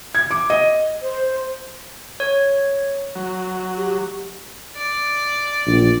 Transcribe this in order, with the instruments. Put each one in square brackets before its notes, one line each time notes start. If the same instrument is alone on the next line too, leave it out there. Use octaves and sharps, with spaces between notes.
[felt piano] G#6
D6
D#5
[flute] C5
[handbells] C#5
[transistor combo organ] F#3
[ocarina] G4
[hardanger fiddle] D5
[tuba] A#1